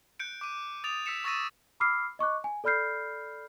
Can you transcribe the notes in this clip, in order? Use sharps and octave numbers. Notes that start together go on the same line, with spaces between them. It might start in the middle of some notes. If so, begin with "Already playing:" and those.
F#6 G6 C#7 D7
D6 D#7
D#6 A6 D7 F7
E6 B6 C#7 E7
C#6 E6 A6 A#6 D#7 E7
B5 D6 E6 F6 C7
D#5 C#6 D6 F#6
G#5
A4 D5 B5 F6 G6 C7